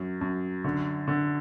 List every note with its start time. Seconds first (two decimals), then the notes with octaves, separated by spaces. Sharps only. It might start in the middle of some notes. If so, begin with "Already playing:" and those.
Already playing: F#2
0.21 F#2
0.64 D3
1.08 D3